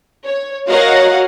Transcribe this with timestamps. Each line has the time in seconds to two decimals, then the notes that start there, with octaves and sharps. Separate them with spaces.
0.24 C#5
0.68 F#4 A#4 C#5 D#5 F5 F#5